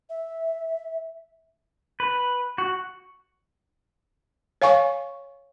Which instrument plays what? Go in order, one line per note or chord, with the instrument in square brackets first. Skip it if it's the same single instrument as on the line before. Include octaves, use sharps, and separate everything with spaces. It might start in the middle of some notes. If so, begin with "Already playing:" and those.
[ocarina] E5
[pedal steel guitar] B4
F#4
[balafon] C#5 F5 G#5 C#6